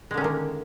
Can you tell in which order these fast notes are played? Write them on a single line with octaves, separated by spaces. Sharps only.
G#3 D3 C#4 D#3 A#3